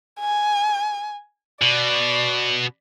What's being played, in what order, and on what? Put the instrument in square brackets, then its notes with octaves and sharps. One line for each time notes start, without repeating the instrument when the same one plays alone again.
[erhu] G#5
[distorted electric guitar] B2 [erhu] D5